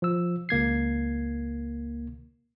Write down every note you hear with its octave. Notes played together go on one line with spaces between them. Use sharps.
F3 E6
C#2 A#3 G#6 C7